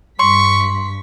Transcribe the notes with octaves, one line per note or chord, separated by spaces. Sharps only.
G2 C6 C#6 B6